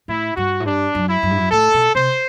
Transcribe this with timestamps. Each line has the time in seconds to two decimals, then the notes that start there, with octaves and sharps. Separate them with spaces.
0.08 A2 E4
0.37 G2 F#4
0.60 A2
0.65 G2 D4
0.95 F#2
1.09 E4
1.23 F#2
1.30 G2
1.38 F#2
1.51 A2 A4
1.74 B2
1.95 C3 C5